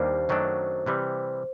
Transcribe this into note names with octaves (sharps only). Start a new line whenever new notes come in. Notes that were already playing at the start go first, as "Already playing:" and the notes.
Already playing: D#2 D#3 G3 A#3 D4 C5
F#2 D#3 F#3 A3 D4
C3 E3 G3